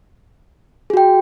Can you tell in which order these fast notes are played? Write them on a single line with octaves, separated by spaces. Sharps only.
G#4 F#4 G5